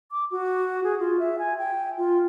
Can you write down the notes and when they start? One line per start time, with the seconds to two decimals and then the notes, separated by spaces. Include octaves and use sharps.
0.11 D6
0.31 F#4
0.84 G#4
0.99 F4
1.20 E5
1.39 G#5
1.58 G5
1.97 F4